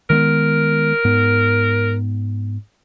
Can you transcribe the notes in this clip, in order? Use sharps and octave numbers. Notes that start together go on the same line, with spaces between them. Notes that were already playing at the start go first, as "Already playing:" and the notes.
D#3 G#3 B3 A#4
G#2 B3